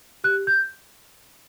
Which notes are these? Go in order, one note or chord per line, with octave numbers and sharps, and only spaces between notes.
G4 F#6
G6